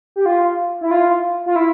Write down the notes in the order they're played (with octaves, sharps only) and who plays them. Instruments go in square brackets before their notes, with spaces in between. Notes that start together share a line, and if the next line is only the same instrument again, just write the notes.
[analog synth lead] G4
F4
E4
F4
F4
E4